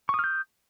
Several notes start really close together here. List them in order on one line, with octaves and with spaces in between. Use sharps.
C#6 D#6 F6 G6